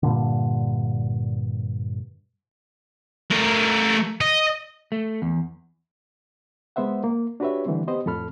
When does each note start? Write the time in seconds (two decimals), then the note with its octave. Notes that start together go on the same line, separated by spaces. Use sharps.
0.03 G2 A#2 D3
3.31 A3 A#4
4.21 D#5
4.92 A3
5.22 E2
6.76 G#3 B3 C5 E5 F#5
7.04 A#3
7.40 D4 F#4 G4 B4 C#5 E5
7.65 D3 E3 G3 A3 C4
7.88 B3 G4 C5 D#5
8.06 F2 A2 A4 B5 F6